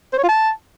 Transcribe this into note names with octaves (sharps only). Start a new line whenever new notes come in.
C5
C#5
F4
A5